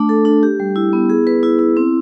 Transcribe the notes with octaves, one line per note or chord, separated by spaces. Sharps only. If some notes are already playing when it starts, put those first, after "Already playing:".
Already playing: A3 D4
A4
D4
G4
G3
E4
B3
G#4
B4
E4
E4
C4